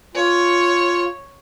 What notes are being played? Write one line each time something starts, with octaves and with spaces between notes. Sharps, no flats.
F4 C#5